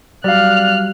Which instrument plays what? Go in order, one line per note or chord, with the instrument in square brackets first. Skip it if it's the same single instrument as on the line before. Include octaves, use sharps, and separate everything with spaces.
[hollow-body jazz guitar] F#3 G3 [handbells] D5 F5 [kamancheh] F6 F#6